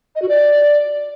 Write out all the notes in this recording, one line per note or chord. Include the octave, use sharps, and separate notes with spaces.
D#5
F#4
D5